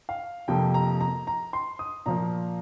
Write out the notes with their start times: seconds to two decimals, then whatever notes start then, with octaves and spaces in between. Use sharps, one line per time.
0.09 F5
0.48 F2 C3 F3 A#3 G5
0.74 A#5
1.01 A#5
1.27 A#5
1.53 C6
1.79 D#6
2.06 A#2 F3 A#3 A#5